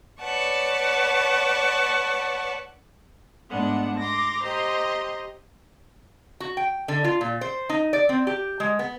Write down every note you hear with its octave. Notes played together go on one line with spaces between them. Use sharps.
B4 C#5 D5 F#5 A5 C#6
G#2 A3 B3 D4 F#5
A#5 C6 D6 A#6
G4 C5 D#5 A#5 C6
F#4
G5
D3
F4
A#2
C5
D#4
D5
C4
G4
G#3
B3